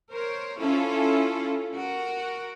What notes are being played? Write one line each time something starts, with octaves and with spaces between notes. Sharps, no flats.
A#4 C5 C#5
C#4 E4 F4 A4
F#4 A#4